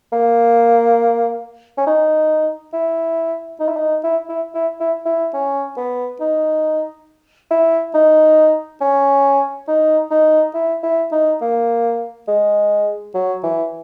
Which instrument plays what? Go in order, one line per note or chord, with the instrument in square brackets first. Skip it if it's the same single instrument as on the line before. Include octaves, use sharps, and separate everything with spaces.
[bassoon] A#3
C#4
D#4
E4
D#4
E4
D#4
E4
E4
E4
E4
E4
C#4
B3
D#4
E4
D#4
C#4
D#4
D#4
E4
E4
D#4
A#3
G#3
F#3
E3